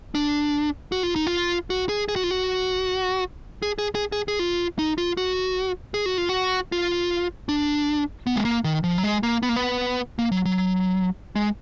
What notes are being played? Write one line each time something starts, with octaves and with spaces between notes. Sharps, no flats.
D4
F#4
F4
D#4
F4
F#4
G#4
G#4
F#4
F4
F#4
G#4
G#4
G#4
G#4
G#4
F4
D#4
F4
F#4
G#4
F#4
F4
F#4
F4
D4
B3
G#3
A#3
D#3
F3
F#3
G#3
A#3
B3
A#3
B3
A#3
F#3
F#3
G#3